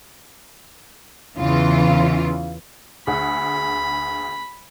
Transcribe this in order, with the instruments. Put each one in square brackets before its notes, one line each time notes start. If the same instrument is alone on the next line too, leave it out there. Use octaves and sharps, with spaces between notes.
[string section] E2 C#3 E3 F4
[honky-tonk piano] D2 G#4 F#5 [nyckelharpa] B5